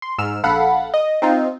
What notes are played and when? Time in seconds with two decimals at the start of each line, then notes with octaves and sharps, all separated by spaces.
0.02 C6
0.18 G#2 E6 F6 E7
0.43 A#1 A4 F5 F#5 B5
0.94 D#5
1.22 C4 D#4 F4